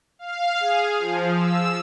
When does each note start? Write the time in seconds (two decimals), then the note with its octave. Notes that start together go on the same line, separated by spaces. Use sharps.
0.19 F5
0.60 G#4
0.98 F3
1.36 E6